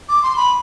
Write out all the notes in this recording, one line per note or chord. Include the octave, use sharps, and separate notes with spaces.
D6
C6
B5